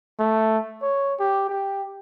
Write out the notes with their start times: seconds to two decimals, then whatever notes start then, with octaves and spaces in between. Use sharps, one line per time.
0.19 A3
0.82 C#5
1.19 G4
1.49 G4